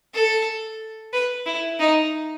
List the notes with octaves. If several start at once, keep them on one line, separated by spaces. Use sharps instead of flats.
A4
B4
E4
D#4